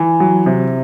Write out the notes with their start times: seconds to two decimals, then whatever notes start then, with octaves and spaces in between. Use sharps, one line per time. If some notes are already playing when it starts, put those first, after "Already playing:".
Already playing: E3
0.20 F#3
0.46 C3